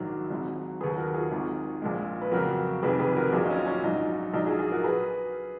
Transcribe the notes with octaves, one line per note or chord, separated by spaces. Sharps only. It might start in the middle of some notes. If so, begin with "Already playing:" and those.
Already playing: A#1 G#2 D#3 F#3
G#1 G#2 F#3
D#2 D#3 F#3 G#4 B4
F#4 A#4
F4 G#4
G#1 G#2 D#3
A#1 A#2 G#3
B4
F2 C#3 F#3 F#4 A#4
F1 F2 D#3 G#4 B4
G#4 B4
F#4 A#4
A#1 A#2 F#3 F4 G#4
D#4
C#4 F4
C#4 F4
A#1 G#2 F#3 D#4
A#1 G#2 F#3 D#4
F4 G#4
F4 G#4
F#4 A#4
G#4 B4